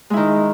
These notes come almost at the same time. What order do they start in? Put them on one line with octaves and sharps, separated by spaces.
G#3 E4 D#3